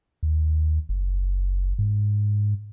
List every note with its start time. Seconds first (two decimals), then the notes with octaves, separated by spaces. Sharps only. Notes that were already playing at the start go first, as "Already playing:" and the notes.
0.23 D#2
0.89 F#1
1.79 G#2